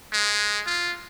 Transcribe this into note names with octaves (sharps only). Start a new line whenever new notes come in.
G#3
F4